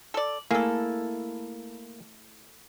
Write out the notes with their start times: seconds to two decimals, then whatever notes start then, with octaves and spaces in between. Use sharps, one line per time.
0.14 A4 D5
0.51 A3 A#3 E4 G#4 A4